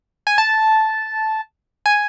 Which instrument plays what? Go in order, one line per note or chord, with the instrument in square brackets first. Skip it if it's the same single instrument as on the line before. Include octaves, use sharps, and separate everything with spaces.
[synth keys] G#5
A5
G#5